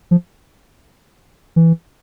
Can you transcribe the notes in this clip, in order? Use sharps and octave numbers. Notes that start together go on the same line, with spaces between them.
F3
E3